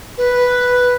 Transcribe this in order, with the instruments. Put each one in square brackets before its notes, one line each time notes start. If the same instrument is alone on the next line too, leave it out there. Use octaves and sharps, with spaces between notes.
[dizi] B4